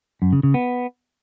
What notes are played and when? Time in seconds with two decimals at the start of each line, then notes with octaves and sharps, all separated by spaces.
0.22 F#2
0.33 C#3
0.43 C#3
0.54 B3